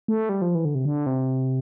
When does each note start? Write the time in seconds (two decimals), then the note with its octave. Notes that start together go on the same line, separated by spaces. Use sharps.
0.08 A3
0.29 G3
0.42 F3
0.55 E3
0.65 D3
0.75 C3
0.85 D3
1.06 C3